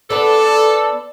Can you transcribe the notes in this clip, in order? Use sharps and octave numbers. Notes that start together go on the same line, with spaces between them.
B3 D4 A4